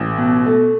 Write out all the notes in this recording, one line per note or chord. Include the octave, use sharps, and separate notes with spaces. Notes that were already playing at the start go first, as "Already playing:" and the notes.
Already playing: A1
B2
A3